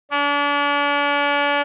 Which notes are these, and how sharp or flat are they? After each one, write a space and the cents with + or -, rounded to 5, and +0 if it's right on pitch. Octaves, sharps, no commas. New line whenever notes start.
D4 -40